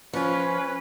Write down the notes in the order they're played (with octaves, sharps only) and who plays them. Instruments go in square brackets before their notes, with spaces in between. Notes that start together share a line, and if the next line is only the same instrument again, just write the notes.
[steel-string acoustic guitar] F3 [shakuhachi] C#4 [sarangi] B4